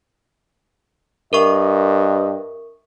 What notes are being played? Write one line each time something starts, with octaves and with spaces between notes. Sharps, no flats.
G2 A#4 D#5 E5 C#6